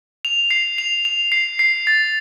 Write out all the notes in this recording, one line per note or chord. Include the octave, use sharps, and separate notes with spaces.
F7
C7
F7
F7
C7
C7
A6